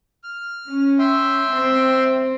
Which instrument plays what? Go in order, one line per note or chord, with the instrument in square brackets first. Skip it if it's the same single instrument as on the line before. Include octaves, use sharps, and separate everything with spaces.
[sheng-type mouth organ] F6
[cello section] C#4
[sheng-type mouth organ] E5 G5 C6
[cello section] C4